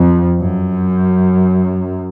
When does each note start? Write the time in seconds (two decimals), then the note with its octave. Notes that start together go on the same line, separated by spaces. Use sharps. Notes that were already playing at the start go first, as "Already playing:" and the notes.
Already playing: F2
0.40 F#2